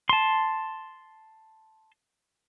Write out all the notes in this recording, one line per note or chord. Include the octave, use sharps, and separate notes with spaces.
A5 C6